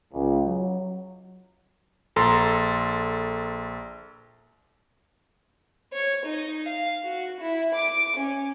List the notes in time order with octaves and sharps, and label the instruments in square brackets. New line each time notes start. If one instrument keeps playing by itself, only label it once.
[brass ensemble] C#2
F#3
[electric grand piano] A#1 A4 A#5 C6
[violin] C#5
D#4
F5
F#4
E4
D6
C#4